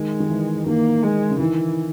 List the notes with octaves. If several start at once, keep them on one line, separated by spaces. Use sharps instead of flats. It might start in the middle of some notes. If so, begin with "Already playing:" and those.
Already playing: D#3 G#3
D#3
E3
D#3 A#3
G#3
C#3
D#3 E3